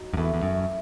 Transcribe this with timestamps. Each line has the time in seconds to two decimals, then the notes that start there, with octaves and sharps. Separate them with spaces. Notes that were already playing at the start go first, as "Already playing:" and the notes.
Already playing: F#3 D#4
0.13 F#2
0.17 E2 A3 E4 B4
0.34 E2
0.43 F#2